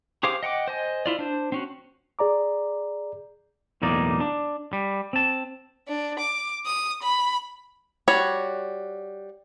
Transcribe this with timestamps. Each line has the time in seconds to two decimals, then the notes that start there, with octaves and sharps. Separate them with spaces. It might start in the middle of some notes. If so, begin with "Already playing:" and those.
0.23 G4 G#4 C5 F5 D6
0.43 D#5 F#5 G5 D6
0.68 C5 D#5 G#5
1.06 E4 F4 D5
1.19 D4 C5
1.52 C4 C#4 F#4
2.19 G#4 D5 A#5 D6
3.82 B1 E2 A2 A#3 D#4 D5
4.20 D4
4.73 G3
5.13 C4 A5
5.88 D4
6.20 D6
6.66 D#6
7.03 B5
8.08 G3 F#4 C#5